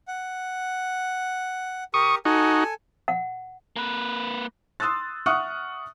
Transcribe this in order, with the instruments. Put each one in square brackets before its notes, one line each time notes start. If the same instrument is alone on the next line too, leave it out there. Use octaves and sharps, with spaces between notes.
[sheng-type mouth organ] F#5
[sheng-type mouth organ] G4 A#4 [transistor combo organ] C#6 D#6
[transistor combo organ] D#4 F#4 [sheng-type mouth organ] A4 G#5
[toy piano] F#5
[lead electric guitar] A#3 B4
[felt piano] C6 D#6 E6 F#6 A6
E5 F#5 C#6 D#6 F6 F#6